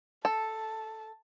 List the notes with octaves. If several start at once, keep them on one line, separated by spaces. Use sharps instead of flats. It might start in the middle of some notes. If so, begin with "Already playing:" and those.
A4 A5